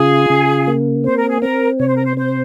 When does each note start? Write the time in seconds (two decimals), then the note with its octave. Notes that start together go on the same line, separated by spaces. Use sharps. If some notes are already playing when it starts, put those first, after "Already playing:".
Already playing: C#3 F4 G#4
0.30 C#3
0.67 A#3
1.04 C4 C5
1.17 A#4
1.29 G#4
1.41 C4 A#4
1.79 C3 C#5
1.88 C5
1.96 A#4
2.04 C5
2.17 C4 C5